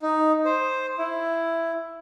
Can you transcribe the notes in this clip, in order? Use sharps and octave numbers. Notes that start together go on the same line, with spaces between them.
D#4
C5
E4